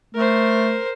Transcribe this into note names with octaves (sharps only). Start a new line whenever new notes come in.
A3 A#4 C5